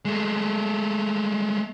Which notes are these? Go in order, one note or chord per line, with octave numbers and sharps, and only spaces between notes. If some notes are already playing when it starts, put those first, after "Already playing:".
G#3 A3